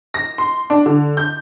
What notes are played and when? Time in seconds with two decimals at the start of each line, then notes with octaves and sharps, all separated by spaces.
0.14 A#6
0.38 C6
0.70 D4
0.86 D3
1.17 G6